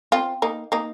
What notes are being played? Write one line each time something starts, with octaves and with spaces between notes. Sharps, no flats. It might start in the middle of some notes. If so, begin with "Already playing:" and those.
C4 F4
A#3 D#4
A#3 D#4